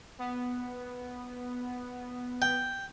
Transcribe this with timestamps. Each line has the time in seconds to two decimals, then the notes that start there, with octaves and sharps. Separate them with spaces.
0.19 B3
2.42 G5